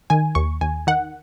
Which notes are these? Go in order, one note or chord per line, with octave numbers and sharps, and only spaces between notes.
D#3 G#5
D#2 C#6
D#2 G#5
D#3 F#5